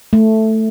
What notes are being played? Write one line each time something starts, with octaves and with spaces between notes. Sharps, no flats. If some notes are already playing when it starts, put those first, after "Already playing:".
A3